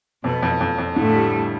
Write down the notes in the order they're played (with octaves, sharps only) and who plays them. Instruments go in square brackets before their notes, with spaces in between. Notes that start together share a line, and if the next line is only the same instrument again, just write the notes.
[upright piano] F2 [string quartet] B2 B3
[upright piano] F2
F2
F2
[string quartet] A2 A3 [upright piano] D3
[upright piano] G3
G3